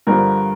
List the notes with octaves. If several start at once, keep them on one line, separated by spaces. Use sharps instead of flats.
G2 D3 F3 A#4